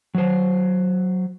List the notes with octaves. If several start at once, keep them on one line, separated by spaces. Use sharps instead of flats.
F#3 C5